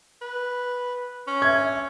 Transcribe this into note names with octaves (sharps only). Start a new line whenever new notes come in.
B4
C#4
E5 G#6